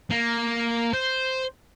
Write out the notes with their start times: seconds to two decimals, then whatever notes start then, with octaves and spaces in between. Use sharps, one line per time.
0.11 A#3
0.94 C5